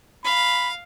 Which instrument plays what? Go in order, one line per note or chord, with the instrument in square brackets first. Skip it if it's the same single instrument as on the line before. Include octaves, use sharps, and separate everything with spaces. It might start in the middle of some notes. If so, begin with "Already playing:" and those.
[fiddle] F5 [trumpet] B5